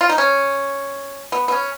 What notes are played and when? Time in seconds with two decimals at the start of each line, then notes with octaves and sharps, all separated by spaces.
0.01 F4
0.09 D#4
0.18 C#4
1.32 B3
1.48 B3
1.52 C#4